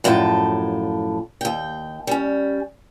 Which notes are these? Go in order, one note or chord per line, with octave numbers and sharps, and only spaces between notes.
F#2 A2 F3 G5 A5
D#2 G5
G3 C#4